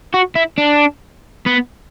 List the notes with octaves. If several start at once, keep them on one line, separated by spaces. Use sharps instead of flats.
F#4
E4
D4
B3